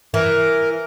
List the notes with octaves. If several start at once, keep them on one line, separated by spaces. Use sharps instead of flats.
E3 A#4